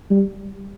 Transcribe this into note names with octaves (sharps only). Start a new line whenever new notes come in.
G3